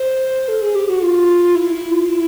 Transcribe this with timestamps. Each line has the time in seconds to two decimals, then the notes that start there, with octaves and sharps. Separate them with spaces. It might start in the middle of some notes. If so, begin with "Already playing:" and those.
Already playing: C5
0.48 A4
0.62 G#4
0.75 G4
0.88 F#4
1.02 F4
1.55 E4
1.73 E4
1.91 F4
2.09 E4